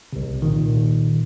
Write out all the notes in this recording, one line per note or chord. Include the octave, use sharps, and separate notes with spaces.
C2 C3
A#2 D#3